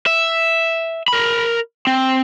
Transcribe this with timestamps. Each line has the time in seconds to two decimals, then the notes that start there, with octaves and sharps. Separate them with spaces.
0.07 E5
1.08 A#4 B5
1.87 C4